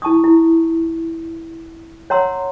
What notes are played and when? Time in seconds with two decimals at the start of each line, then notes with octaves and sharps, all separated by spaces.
0.02 E4 A5 C#6 D#6
0.24 E4
2.10 C#5 F#5 A#5 C6 E6